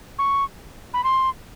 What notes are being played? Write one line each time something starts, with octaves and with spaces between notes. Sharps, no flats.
C#6
B5
C6